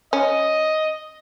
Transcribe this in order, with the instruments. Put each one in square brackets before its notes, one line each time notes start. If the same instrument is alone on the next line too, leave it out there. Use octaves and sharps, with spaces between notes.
[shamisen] C#4 [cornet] D#5